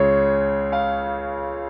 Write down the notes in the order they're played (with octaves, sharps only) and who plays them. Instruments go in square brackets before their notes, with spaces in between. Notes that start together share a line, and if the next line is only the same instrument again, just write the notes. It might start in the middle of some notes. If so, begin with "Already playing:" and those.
Already playing: [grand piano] C#2 C#3 C#5
F5